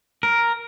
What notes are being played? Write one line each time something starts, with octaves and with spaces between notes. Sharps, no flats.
A#4